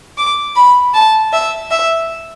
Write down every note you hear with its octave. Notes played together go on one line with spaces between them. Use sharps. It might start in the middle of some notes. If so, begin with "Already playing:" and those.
D6
B5
A5
E5
E5